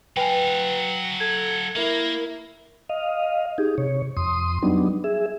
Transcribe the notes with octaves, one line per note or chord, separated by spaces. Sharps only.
F#3 B4 F5 G5 G#5
A4 G#6
A#3 E4 A#4
D#5 F5
D#4 G4 G#4
C3 C#5
F2 C6 D#6
F#3 G3 B3 D4 D#4
G#4 E5